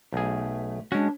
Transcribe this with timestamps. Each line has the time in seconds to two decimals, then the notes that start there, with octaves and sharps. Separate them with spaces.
0.13 B1 A3 G#4
0.92 G#3 C#4 D4 F#4